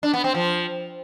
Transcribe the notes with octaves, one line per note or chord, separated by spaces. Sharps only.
D4
B3
C4
F3